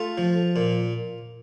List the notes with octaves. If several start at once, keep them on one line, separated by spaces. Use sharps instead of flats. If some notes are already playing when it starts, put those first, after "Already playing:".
Already playing: A3 F4
F3
A#2